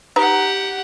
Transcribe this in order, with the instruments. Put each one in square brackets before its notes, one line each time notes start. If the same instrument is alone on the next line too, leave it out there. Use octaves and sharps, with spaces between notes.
[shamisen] D#4 B4 A#5 [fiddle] G4 F#5